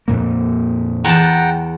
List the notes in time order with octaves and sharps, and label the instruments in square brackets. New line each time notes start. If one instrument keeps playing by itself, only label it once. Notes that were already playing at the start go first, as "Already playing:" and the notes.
[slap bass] F2 A#2 A#3
[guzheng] E2 A5 [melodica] F#5 G5 A#5